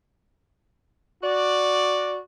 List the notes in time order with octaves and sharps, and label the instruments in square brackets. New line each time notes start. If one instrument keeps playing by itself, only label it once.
[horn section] F#4 D5